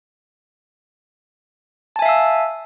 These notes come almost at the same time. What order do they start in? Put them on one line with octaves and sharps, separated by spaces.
A5 G#5 E5 F5 E6